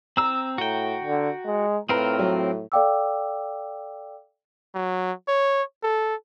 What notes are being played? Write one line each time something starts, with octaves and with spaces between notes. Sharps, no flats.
C4 A#5 E6
A2 F#4 G5
D3
G#3
A2 C4 F4 A#4 B4 A#5
F#3
A4 D5 F5 G5 D6 E6
F#3
C#5
A4